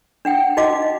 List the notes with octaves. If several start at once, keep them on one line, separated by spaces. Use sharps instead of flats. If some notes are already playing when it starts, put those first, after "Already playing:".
D4 F#5 G5
D#4 F#4 D#5 F5 D6